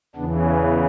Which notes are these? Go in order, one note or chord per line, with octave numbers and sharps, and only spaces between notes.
E2 C#3 E3 B3 D4